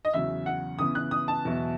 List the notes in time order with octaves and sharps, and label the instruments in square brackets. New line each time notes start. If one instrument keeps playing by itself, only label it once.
[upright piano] D#5
[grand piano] E2 C#3 F#3 [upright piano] E5
[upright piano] F#5
[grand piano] C#3 E3 B3 [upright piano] D#6
[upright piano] F#6
D#6
A5
[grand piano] E2 B2 F#3 B3 E4